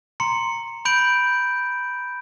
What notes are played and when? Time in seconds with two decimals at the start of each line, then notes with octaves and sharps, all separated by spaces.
0.20 A#5 C6 C#7
0.85 B5 G6 D7 F#7